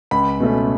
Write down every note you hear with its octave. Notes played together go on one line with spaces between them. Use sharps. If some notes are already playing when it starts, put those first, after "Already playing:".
C#2 B5
B2 A3 C#4